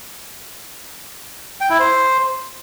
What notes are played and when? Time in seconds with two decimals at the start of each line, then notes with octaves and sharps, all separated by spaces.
1.61 G5
1.70 E4
1.79 C5